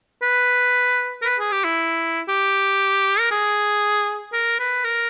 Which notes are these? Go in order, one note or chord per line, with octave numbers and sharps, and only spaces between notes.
B4
A#4
B4
G#4
G4
E4
G4
A#4
G#4
A#4
B4
A#4